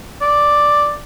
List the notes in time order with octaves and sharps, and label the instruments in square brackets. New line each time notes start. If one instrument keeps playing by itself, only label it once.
[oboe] D5